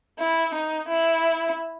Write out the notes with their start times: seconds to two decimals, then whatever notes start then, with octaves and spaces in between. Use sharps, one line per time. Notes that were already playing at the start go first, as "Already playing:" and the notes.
0.19 E4
0.54 D#4
0.89 E4